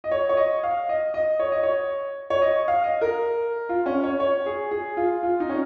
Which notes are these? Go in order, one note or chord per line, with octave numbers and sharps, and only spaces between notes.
D#5
C#5
C#5
D#5
F5
D#5
D#5
C#5
D#5
C#5
C#5
D#5
F5
D#5
A#4
F4
C#4
C#5
C#5
G#4
G#4
F4
F4
D#4
C#4